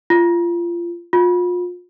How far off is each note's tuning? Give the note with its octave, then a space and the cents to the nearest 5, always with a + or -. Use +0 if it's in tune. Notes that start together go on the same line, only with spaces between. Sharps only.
F4 -25
F4 +35